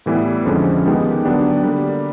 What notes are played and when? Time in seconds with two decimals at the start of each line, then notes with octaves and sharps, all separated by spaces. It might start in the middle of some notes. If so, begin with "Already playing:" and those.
0.06 A2 E3 G3 B3 E4
0.45 F2 D3 F3 G#3 C#4
0.85 D#3 G#3 B3 D#4 G4
1.25 D3 F#3 B3 D4 G4
1.63 D3 G3 A#3